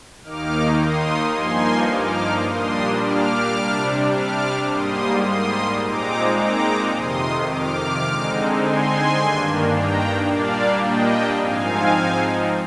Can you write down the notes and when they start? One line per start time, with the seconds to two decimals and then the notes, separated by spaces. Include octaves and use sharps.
0.23 D#2 D#3 A#3 D#4 D6 F6
0.79 C6 D#6
1.35 G2 F3 A#3 D#4 G#5 C6
1.90 D6 F6
2.47 A#2 G3 A#3 D4 C6 D#6
3.03 D6 F6
3.58 C3 G3 D4
4.13 D6 F6
4.69 G#2 G3 A#3 C6 D#6
5.25 C6 D#6
5.81 A#2 G#3 C4 D#4 A#5 D6
6.37 A#5 D6
6.92 F2 C3 D#3 C6 D#6
7.49 D6 F6
8.05 D3 G#3 C4 D#4
8.61 G#5 C6
9.16 G2 D#3 A#3 D4
9.71 G5 A#5
10.27 A#2 G3 A#3 D4 D5 F5
10.83 D#5 G5
11.39 G#2 F3 C4 D#4 F5 G#5